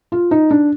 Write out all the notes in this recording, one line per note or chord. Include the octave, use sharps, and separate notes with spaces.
F4
D#4
D4